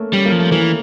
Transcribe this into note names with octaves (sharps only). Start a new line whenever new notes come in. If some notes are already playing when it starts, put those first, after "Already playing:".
Already playing: A3 A#3 C#4
G3 C#4
A#3
F3
A3
E3 A#3